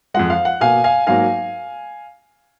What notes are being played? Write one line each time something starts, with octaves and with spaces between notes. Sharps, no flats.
F2 F3 G#3 F#5
F5
F#5
B2 A#3 F5 G#5
F5 G#5
G#2 F#3 A#3 F5 G#5